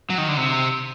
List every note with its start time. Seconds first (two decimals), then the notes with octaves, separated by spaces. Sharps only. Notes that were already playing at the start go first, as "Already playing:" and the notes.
0.10 F#3
0.18 D#3
0.29 D3
0.37 C3